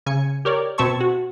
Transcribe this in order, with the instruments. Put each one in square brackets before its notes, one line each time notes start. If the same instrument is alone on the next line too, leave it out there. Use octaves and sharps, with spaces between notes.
[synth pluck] C#3 G#5 C#7
G4 A#4 C#5 D5
B2 C4 E5 A5 C#6 G#6
F#4